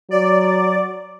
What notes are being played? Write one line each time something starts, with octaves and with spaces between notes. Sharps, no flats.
F#3 D5